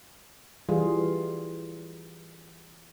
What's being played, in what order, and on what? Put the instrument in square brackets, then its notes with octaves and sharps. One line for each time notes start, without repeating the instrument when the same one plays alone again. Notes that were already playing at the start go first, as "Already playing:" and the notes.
[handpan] E3 G3 F4 G#4